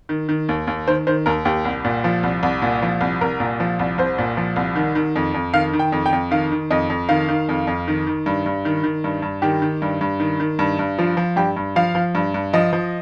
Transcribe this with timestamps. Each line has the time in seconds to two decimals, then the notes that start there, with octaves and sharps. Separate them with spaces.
0.09 D#3
0.29 D#3
0.49 D#2
0.67 D#2
0.88 D#3 C5
1.07 D#3 C5
1.26 D#2 A#4
1.45 D#2 G4
1.65 C2
1.85 A#2
2.04 F3
2.23 C2
2.43 C2
2.62 A#2
2.82 F3
3.01 C2
3.21 C2 A#4
3.40 A#2
3.60 F3
3.79 C2
3.98 C2 C5
4.18 A#2
4.37 F3
4.56 C2
4.76 D#3
4.95 D#3
5.16 F2
5.34 F2
5.54 D#3 F5
5.73 D#3
5.79 G5
5.92 F2
6.06 G5
6.13 F2
6.31 D#3 F5
6.52 D#3
6.71 F2 D#5
6.90 F2
7.09 D#3 F5
7.29 D#3
7.49 F2
7.67 F2
7.88 D#3
8.07 D#3
8.26 G2
8.46 G2
8.65 D#3
8.84 D#3
9.04 G2
9.22 G2
9.42 D#3 G4
9.62 D#3
9.82 G2
10.01 G2
10.20 D#3
10.40 D#3
10.59 G2
10.79 G2
10.98 F3 F4
11.17 F3
11.36 G2 G4
11.57 G2
11.76 F3 F5
11.95 F3
12.15 G2
12.34 G2
12.53 F3 D#5
12.73 F3